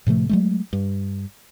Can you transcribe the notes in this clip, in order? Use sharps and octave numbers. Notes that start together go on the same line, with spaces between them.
A2 C3 F3 A3
F#3 G#3 A3
G2